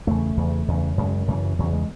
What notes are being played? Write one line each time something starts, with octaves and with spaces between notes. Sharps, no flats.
E2 C#3 A3
E2 C#3
E2 C#3
F#2 C#3 G#3
F#2 C#3 E3
E2 C#3 F#3
G#3